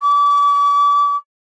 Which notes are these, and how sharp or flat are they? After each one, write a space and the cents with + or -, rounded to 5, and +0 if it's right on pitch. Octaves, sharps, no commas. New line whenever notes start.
D6 -35